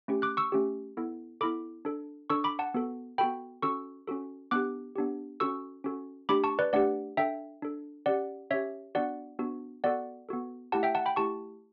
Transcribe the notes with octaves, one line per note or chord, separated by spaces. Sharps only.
A3 C#4 G4
D6 F#6
C#6 E6
A3 C#4 G4
B3 E4 A4
B3 E4 A4 B5 D6
D4 A4
D4 A4 C#6 E6
B5 D6
F#5 A5
B3 F#4 A4
B3 F#4 A4 G5 B5
C#4 F#4 A4 C#6 E6
C#4 F#4 A4
B3 D4 G4 D6 F#6
B3 D4 G4
C#4 F#4 A4 C#6 E6
C#4 F#4 A4
A3 D4 G4 B5 D6
A5 C#6
B4 D5
A3 D4 G4 D5 F#5
D4 A4 E5 G5
D4 A4
C#4 G4 D5 F#5
C#4 G4 C#5 E5
B3 D4 F#4 D5 F#5
B3 D4 F#4
B3 F#4 A4 D5 F#5
B3 F#4 A4
A3 E4 G4 F#5 A5
E5 G5
F#5 A5
G5 B5
A3 E4 G4 A5 C#6